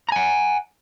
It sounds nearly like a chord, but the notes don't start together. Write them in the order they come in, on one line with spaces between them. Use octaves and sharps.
A#5 G#5 F#5